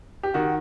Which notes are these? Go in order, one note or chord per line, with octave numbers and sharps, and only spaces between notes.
G4
D#3 F#4